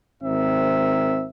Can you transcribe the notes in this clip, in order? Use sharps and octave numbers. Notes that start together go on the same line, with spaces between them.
G#1 C4 A#4 E5